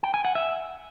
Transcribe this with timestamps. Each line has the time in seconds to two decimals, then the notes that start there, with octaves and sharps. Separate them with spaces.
0.03 G5
0.14 G#5
0.25 F#5
0.35 E5